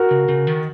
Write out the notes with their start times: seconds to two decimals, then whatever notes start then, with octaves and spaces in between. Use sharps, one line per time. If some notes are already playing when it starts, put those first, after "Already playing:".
Already playing: F#4 A#4
0.11 C#3
0.29 C#3
0.47 D#3